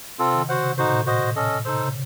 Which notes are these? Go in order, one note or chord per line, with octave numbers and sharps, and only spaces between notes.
C3 C4 F4 A4
D#3
C#3 F#4 C5 F#5
C3
A2 D#4 F#4 C5
A#2
A2
F#4 C5 D#5
C#4 A4 D#5
C3 D#4 A4 C5
C#3